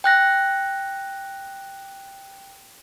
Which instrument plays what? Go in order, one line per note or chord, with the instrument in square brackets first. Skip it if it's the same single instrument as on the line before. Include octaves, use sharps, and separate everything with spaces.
[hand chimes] G5 F#6 A#6